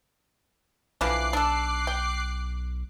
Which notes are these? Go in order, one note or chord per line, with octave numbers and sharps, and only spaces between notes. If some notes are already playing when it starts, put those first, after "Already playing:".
B1 D3 E3 F3 D6 F#6 C7
D4 A4
G5